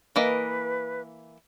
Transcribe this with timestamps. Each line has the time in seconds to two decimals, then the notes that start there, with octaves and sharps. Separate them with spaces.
0.16 E3 A#3 B4 D#5